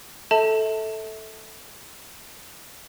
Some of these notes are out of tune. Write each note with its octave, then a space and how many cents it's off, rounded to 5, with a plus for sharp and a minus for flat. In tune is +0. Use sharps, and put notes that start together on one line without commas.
A4 +0 E5 -30 A5 +25